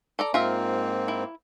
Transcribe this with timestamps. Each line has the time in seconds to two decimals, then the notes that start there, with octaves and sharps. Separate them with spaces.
0.19 A4 D5 A#5
0.34 G#2 A#3 C4 F4 A#4 E5
1.08 E4